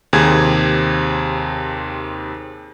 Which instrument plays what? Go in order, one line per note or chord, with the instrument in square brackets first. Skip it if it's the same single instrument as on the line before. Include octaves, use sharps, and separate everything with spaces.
[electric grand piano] D#2 C3 G#4 G#6